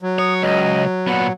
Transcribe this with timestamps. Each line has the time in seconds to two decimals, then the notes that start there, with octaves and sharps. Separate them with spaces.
0.02 F#3
0.18 C#5 D#6
0.42 C#2 D#5
1.07 A#2 B3 F#5